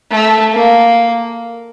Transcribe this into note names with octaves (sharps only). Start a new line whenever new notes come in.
A3
A#3